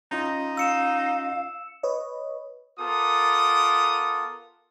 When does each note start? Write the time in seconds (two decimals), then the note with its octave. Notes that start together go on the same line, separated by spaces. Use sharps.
0.11 C#4 D#4 F4 D#5
0.57 F5 E6 C#7 E7
1.83 B4 C#5 D#5
2.79 B3 F4 A4 A#4 D6 D#6